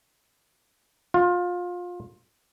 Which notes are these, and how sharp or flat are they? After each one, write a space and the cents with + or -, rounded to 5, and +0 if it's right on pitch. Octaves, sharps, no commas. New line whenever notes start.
F4 +25